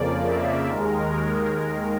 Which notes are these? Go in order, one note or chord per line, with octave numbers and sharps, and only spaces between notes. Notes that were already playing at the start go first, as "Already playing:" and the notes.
Already playing: F2 C#3 F3 A#3 D5
E5
D#2 D#3 G#3 A#4